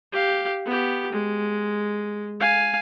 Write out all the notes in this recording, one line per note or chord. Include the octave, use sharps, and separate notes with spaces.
G4 F5
B3 G4
G#3
F5 G#5